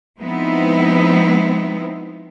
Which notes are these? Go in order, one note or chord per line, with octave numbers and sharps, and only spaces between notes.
F3 G#3 B3 C4 D#4 E4